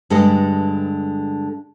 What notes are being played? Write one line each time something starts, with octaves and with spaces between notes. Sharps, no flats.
G2 D3 G#3 A4 B4 D#5